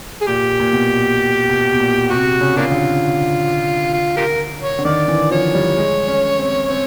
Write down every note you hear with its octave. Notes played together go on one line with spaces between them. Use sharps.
G#4
A#2 G4
A#2
B2
B2
B2
A#2
C3 F#4
C#3
A#3 D4 F4
D3
F4
F4 G4 A#4
C#5
D3
D#3 D5
E3
F3 C#5
G3
G#3
C#4
C4
C4